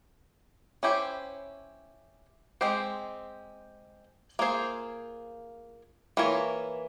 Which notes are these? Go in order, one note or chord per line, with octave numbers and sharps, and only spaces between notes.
C#4 E4 G4 C5
G#3 C4 G4 C5
A#3 F4 G#4 C5
E3 A#3 F4 A#4 C#5